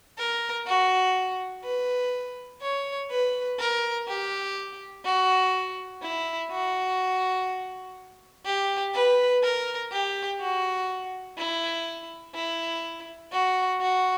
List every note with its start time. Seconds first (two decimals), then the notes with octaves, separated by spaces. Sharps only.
0.18 A#4
0.67 F#4
1.64 B4
2.61 C#5
3.11 B4
3.60 A#4
4.08 G4
5.05 F#4
6.03 E4
6.51 F#4
8.46 G4
8.94 B4
9.43 A#4
9.92 G4
10.41 F#4
11.38 E4
12.35 E4
13.32 F#4
13.81 F#4